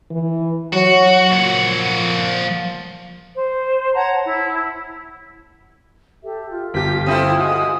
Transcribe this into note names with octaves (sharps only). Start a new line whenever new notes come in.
E3
F#3 F#4
A#2 F3 F#5
C5
C#5 F#5 A5 A#5
E4
G4 A4 E5
F4
G1 G4 B6
C4 E4 A4 D#6
G#3 F#4